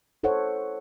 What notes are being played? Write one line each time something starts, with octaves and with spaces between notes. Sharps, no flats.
E4 A4 C5 C#5 F#5